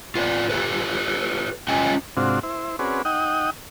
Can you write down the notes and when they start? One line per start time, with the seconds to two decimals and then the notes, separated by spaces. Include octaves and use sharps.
0.15 F4 B4 C#5 D5
0.50 F4 G4 A4 B4
1.68 C#4 F4 D#5 G5 G#5
2.17 G#2 C3 C4 D4 F4 F#4
2.43 E4 C5
2.79 C4 C#4 F#4 G#4 B4 D5
3.05 D#4 D#5 F#5 G5 D#6